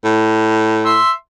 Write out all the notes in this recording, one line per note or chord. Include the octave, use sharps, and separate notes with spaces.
A2
E5 C6